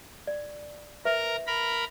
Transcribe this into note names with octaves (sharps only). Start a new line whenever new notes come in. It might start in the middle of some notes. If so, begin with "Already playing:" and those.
D5
A#4 B4 E5 A#5
A#4 A#5 B5